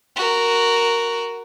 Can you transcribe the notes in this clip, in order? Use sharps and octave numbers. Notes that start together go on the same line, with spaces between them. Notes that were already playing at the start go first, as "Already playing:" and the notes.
F#4 A#4